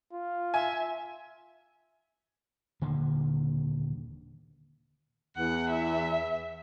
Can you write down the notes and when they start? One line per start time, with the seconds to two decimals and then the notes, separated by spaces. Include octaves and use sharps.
0.13 F4
0.54 E5 G#5
2.81 D#1 D3 D#3 A#3
5.37 E2 F#5
5.70 E5